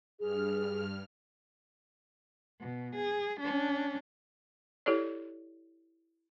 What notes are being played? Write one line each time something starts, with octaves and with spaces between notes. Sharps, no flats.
G2 G#4 F6
B2
G#4
C#4 D4
E4 G4 A4 C#5 D5